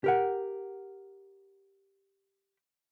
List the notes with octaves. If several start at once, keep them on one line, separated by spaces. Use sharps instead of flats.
G4 A#4 F#5